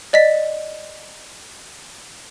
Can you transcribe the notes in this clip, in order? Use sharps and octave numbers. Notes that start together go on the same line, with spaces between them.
D5 D#5 A6 B6